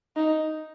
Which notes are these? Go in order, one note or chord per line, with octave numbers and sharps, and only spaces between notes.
D#4